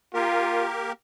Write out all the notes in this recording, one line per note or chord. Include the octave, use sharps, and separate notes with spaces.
A#3 F4 G4 A#4